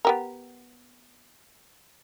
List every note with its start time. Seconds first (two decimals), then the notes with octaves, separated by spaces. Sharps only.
0.05 B3 G4 A#4